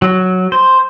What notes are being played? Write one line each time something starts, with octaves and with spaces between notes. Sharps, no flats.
F#3
C5